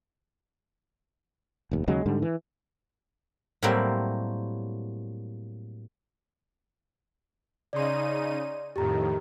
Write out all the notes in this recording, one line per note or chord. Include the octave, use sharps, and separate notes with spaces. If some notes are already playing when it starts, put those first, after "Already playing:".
F1 D#2
D#2 C#3 F#3 G#3
G#2 D3 G3
E3
A2 F#3 G3 A#3 C4 E4
C#3 D#4 D5 C6 D#7
F2 A2 D#3 G4 A#5